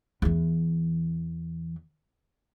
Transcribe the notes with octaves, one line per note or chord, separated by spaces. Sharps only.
E2 E3